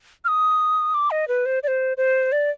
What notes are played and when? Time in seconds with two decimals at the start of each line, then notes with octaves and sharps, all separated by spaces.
0.25 F6
0.28 D#6
0.94 D6
1.11 D#5
1.28 B4
1.46 C5
1.63 D5
1.68 C5
1.97 C5
2.32 D5